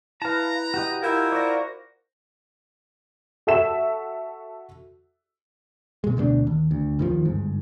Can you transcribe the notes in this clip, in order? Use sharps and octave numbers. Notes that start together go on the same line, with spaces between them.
E4 B4 F5 A5 A#5
F#4 G4 D#5
E4 F4 A#4 E6 G6 G#6
F#4 C5 D5 A#6
F#4 A4 E5 E7
B2 G#3
D2 B2 G#3 D4
D#2
D2
D#2 D#3 F3
G1 G#2